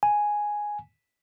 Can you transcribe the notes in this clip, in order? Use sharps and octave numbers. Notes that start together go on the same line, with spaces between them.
G#5